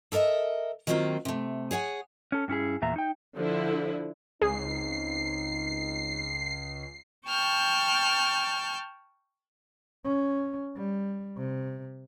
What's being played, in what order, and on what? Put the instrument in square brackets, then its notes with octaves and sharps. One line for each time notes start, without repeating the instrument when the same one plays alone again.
[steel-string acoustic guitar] A4 A#4 C#5 D#5 E5
D#3 F#3 A#3 C4 F4
C3 A3
G#4 C#5 F#5 G#5
[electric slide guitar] C#4 A4
G2 C#4 E4 G#4
E2 A#2 E5 A#5
D#4 G5
[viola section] D3 F3 E4
[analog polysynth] C#2 [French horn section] C4 D#4 [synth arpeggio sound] G#4 [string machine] C7
[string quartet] G5 A5 C#6 F6 G6
[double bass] C#4
G3
C3